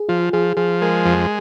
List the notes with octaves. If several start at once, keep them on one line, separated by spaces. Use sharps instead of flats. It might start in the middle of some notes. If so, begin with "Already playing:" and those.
Already playing: G#4
F3 F4
F3 G#4
F3 G#4
G#3 A#4
F2